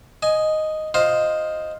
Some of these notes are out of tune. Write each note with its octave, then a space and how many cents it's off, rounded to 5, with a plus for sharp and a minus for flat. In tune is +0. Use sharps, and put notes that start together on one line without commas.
D#5 +0 G#5 +10
F4 +10 C5 +0 D#5 +0